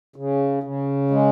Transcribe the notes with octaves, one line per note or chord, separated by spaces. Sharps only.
C#3
C#3
G#3